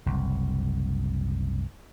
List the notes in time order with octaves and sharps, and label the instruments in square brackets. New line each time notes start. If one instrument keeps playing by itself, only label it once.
[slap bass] F#1 C2